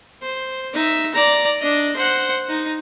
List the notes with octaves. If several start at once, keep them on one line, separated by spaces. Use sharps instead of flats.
C5
D#4 E5
D5 A#5
D4 D#5
C5 F#5
D#4